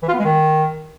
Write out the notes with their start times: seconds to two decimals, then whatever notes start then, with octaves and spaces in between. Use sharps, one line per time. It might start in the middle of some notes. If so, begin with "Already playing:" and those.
0.03 E3
0.08 F4
0.14 B3
0.19 G#3
0.25 D#3